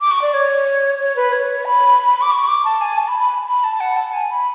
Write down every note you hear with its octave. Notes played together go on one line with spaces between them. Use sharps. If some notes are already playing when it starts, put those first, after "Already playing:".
D6
C#6
D5
C#5
C#5
B4
C#5
B5
D6
C#6
D6
A5
G#5
A5
B5
B5
B5
A5
F#5
A5
G#5
B5